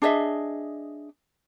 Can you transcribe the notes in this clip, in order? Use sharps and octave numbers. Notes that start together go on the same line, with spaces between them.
D4 G#4 D#5 E5